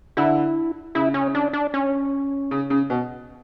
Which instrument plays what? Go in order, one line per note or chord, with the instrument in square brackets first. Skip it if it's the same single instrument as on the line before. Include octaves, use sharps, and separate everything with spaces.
[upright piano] D3 [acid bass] E4
[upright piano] C#3 [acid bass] E4
[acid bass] C#4
D4
D4
C#4
[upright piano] C#3
C#3
B2